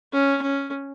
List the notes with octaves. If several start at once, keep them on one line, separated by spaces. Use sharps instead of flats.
C#4
C#4